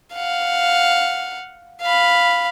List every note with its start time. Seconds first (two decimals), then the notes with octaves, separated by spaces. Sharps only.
0.14 F5 F#5
1.82 F5 B5